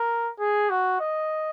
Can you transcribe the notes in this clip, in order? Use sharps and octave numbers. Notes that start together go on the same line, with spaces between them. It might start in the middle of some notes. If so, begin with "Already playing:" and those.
Already playing: A#4
G#4
F#4
D#5